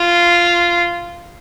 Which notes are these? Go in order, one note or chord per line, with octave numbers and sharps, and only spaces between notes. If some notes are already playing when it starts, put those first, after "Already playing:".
Already playing: F4